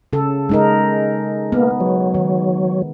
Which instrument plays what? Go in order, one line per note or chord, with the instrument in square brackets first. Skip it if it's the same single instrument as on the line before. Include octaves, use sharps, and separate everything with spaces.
[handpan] C#3 A4
G#3 D#4 A#4
[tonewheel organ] A#3 [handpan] B3
[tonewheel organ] F#3
[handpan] D#3